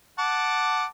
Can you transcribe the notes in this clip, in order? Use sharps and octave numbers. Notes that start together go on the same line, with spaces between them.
F#5 A5 D6